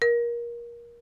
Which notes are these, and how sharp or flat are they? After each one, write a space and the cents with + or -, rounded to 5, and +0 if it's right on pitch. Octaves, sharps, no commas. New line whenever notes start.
A#4 +25